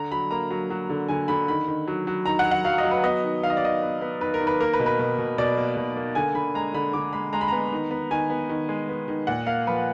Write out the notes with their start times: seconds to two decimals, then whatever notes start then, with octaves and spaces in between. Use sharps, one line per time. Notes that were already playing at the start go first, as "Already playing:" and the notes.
Already playing: D3 A#5
0.11 F#3 B5
0.31 A#3 A#5
0.51 F#3
0.70 F#3
0.90 D3
1.08 D3 G#5
1.28 D3 B5
1.48 D#3 B5
1.68 D#3
1.88 F#3
2.07 F#3
2.26 D#3 A#5
2.39 F#5
2.45 F#3
2.51 F#5
2.64 F#3 F5
2.78 D#5
2.84 F#3
2.91 B4
3.04 B3 D#5
3.23 D#3
3.43 D#3 F5
3.50 D#5
3.57 D5
3.62 D#3 D#5
3.82 B3
4.01 B3
4.20 D#3 B4
4.34 A#4
4.41 D#3
4.47 B4
4.60 A#3 A#4
4.74 B4
4.80 B2
4.86 B4
4.99 B2
5.18 B2
5.38 B2 D5
5.57 A#3
5.77 B2
5.97 A#3
6.15 D3 G#5
6.35 D3 B5
6.54 G#3 A#5
6.74 D3 B5
6.93 D3 D6
7.13 G#3 B5
7.33 G#3 A#5
7.41 B5
7.48 B3 A#5
7.72 D#3
7.91 B3
8.11 D#3 G#5
8.30 B3
8.49 D#3
8.69 G#3
8.89 B3
9.08 D#3
9.27 A#2 F#5
9.47 A#3 F5
9.67 F3 B4